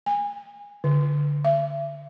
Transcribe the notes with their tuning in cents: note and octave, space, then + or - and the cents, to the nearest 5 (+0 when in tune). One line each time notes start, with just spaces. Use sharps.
G#5 -25
D3 -10
E5 +35